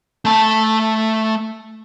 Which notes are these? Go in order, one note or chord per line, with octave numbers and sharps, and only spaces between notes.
A3 A5